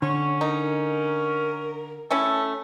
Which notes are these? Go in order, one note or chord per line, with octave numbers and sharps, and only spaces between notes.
D3 C#4 C#5
D#4 A#4
A3 C#4 E4 A4